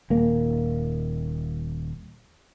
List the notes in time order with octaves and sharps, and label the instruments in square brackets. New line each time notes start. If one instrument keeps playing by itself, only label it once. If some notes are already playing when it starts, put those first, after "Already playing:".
[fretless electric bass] D#1 A#3